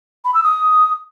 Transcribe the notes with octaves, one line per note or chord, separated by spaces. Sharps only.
B5
E6
D#6